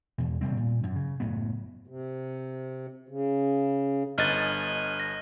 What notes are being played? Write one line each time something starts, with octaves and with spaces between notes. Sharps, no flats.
E2 B2
D#1 C3 G3 C4
A#2
F#2
C#3
F#1 A2 C#3 B3
C3
C#3
G1 D#5 F6 F#6 A6 D#7
A#6